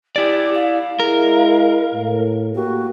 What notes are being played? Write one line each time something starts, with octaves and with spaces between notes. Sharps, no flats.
E4 G4 D5
F5
G#3 E4 A#4
A2
A#3 F#4 G4